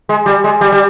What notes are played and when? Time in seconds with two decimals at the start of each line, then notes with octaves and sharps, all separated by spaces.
0.09 G#3
0.26 G3
0.44 G#3
0.61 G3
0.72 G3